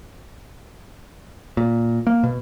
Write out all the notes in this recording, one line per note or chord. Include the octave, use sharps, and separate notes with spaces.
A#2
A#3
B2